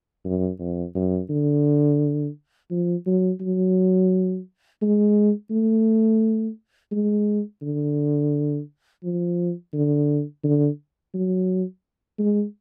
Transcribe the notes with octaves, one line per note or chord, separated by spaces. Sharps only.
F#2
F2
F#2
D3
F3
F#3
F#3
G#3
A3
G#3
D3
F3
D3
D3
F#3
G#3